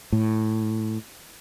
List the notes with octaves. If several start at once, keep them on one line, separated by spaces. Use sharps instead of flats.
A2